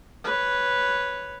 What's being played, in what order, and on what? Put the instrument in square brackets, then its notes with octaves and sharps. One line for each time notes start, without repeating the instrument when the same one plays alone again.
[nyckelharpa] B4 C#5